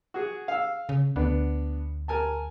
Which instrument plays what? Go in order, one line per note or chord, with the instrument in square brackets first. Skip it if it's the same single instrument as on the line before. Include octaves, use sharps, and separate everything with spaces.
[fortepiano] F#4 G#4
F5 E6
[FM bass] C#3
[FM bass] D2 [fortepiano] B3 D4
[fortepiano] A#4 G#5 A5